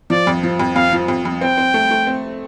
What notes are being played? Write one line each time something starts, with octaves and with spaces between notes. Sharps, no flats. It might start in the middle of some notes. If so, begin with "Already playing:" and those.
F3 D5
F2
F3
F2
F2 F5
F3
F2
F2
C4 G5
C4
A3
A3
C4